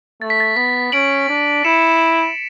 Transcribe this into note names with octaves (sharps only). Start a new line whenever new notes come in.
A3 A6
B6
A6
B3 B6
C#4 D7 F#7
D4
E4 C#7 E7